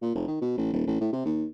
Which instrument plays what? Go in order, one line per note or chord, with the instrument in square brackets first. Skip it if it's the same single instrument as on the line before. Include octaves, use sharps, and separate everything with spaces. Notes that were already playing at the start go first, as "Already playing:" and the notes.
[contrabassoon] A#2
F1
D#3
B2
A1
D#1
A1
A2
C3
D#2